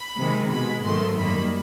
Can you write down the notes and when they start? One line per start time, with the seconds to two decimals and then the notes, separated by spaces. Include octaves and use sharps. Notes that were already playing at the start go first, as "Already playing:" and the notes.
Already playing: B5
0.18 C3 D#3 G#3
0.51 B2 G#3 B5
0.84 G#2 D#3 F#3 A3 C6
1.17 F#2 D#3 G3 A#3 B5